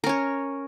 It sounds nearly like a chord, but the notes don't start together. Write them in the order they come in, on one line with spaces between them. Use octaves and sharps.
A#4 C#4 C#5